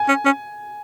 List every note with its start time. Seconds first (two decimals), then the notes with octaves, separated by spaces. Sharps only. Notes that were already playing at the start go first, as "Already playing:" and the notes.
Already playing: G#5
0.08 C#4
0.25 C#4